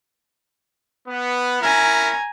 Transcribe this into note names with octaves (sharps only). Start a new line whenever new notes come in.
B3
C#4 E4 A#4 G#5 A#5